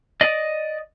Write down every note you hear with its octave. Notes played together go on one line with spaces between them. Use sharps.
D5 D#5